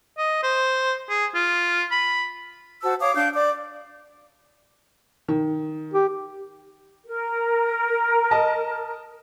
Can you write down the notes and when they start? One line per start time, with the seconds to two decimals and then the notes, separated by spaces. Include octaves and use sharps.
0.18 D#5
0.43 C5
1.10 G#4
1.35 F4
1.91 B5
2.82 F#4 C5 A5 E6
3.01 C#5 F5 D6 D#6
3.16 D4 F5 G6
3.35 D5 D6
5.28 D#3
5.94 G4
7.06 A#4
8.31 D#5 A5